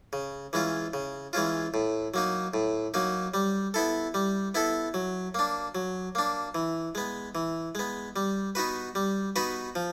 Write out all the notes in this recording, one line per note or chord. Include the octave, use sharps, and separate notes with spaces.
C#3
E3 G#3 C#4 F4
C#3
E3 G#3 C#4 F4
A2
F#3 A#3 D#4
A2
F#3 A#3 D#4
G3
B3 E4 A4
G3
B3 E4 A4
F#3
A#3 D4
F#3
A#3 D4
E3
G#3 B3
E3
G#3 B3
G3
B3 D#4 F#4 B4
G3
B3 D#4 F#4 B4
F3